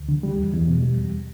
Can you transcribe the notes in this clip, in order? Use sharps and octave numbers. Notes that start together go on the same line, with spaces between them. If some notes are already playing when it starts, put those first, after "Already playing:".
Already playing: D2
D3
G3
E2
E2
B2
G3
E2